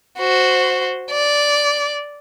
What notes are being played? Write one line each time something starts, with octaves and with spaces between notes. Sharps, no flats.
F#4 C5
D5